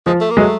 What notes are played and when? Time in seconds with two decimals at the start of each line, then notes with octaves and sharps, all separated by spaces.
0.06 F3 G#3
0.21 A3
0.31 A#3
0.37 F#3 G#3 A3